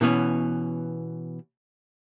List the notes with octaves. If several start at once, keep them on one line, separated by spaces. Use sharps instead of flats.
B2 E3 B3 C#4